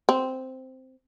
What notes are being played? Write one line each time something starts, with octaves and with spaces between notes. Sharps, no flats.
C4